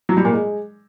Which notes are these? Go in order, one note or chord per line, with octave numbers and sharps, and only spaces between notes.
F#3
G3
A#2
G#3